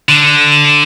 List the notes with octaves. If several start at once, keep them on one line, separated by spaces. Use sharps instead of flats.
D3